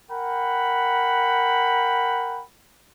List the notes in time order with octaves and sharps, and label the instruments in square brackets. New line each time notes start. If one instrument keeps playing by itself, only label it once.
[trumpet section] A#4 F#5 G5 B5